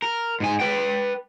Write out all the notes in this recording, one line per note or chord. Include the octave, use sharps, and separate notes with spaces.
A#4
G#2 G#5
B4 G5